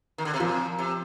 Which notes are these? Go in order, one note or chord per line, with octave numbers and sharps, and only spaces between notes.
D#3
D3
C3
A#2 F3
C3